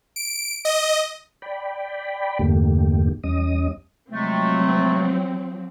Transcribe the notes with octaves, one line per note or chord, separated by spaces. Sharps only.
D7
D#5
D5 G5 B5
E2 G2 D3 A3 A#3 G4
E2 G3 C#4 D#5 D#6
C3 F3 F#3 G#3 A3 C4